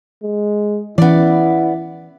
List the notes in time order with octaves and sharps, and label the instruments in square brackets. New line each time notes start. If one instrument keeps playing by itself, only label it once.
[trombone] G#3
[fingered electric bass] E3 C#4 [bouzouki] B3 D5 [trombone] E4